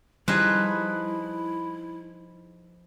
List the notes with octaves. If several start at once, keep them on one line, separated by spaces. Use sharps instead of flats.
F3 G3 D#4 E4 G#4 B4